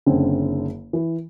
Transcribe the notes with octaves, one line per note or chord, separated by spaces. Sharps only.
F#1 D3 C4 C#4
E3